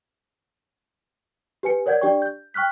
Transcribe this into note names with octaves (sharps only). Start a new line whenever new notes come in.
G4 B4 G#5 C#7
A#4 C#5 D5 F#5 G6 G#6
D4 G4 D5 G5 C#6
G6
G5 C#6 F6 F#6 B6